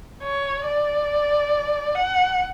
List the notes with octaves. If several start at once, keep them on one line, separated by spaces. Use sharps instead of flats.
C#5
D5
F#5